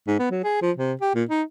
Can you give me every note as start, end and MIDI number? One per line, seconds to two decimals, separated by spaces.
0.07 0.15 44
0.19 0.29 59
0.31 0.40 54
0.44 0.59 68
0.62 0.72 53
0.77 0.93 48
1.01 1.15 67
1.15 1.24 46
1.29 1.42 63